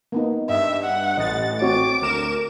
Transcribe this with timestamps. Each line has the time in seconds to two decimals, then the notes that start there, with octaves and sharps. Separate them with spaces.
0.12 A#3 B3 D#4
0.49 G2 D#5 E5
0.84 F#5
1.17 A1 D#5 A6
1.62 C4 F#4 C#5 D6
2.02 D2 A#4 E7